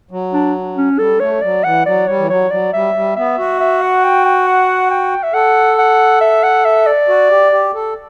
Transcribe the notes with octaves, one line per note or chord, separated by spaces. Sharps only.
F#3
D4
C#4
G3 A4
A3 C#5
F#3 D5
E3 F#5
F#3 D5
G3 C#5
E3
F#3 C#5
F#3 D5
G3 E5
G3
B3 E5
F#4
E5
F#5
G5
G5
F#5
G5
E5
A4 F#5
F#5
E5
F#5
E5
D5
F#4
G4
G4
A4